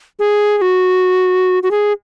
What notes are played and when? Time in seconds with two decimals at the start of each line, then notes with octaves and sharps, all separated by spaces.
0.19 G#4
0.58 G#4
0.62 F#4
1.63 F#4
1.71 G#4